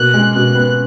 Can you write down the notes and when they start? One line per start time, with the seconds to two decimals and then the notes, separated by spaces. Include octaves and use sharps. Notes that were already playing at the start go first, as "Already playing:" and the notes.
Already playing: B2 A#3 F#6
0.14 G#3
0.35 B2 F#6
0.55 B3